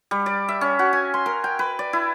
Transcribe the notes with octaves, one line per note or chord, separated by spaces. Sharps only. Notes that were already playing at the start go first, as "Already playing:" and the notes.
G3
D5
E5
C#4
F#4
G#5
C6
A#4
G5
B4
D5
E4